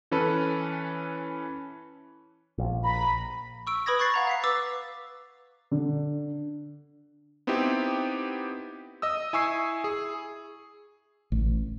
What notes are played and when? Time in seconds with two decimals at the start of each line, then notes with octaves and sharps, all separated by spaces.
0.11 E3 C#4 A4 B4
2.58 A#1
2.84 A#5 B5
3.67 C#6 E6 D7
3.86 B4 B5 D#6 G#6 A#6
3.99 B5 C#6 F#6 G#6 A6 C7
4.14 F5 F#5 A#5
4.27 F5 B6 C7
4.44 B4 D6 E6 A6
5.71 D3
7.47 B3 C4 D#4 E4 G4
9.02 D#5 D#6 E6
9.33 E4 G#5 C#6 E6 C7
9.84 G#4
11.32 A1